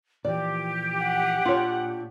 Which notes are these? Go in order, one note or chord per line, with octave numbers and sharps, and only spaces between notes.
A#2 E3 F3 G4 D5
F#5
A#2 D4 F4 C#5